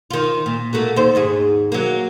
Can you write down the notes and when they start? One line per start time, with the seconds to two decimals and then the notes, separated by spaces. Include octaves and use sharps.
0.11 D#3 F4
0.46 A#2
0.73 A3 A#3 F#4
0.96 D#2 C5
1.15 D#2 G#2 G#4
1.72 F#3 A#3